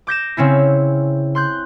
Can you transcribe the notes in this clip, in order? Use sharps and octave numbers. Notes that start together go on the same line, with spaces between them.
D6 G6 A#6 E7
C#3 C4 C#4 E4
C6 F#6 G6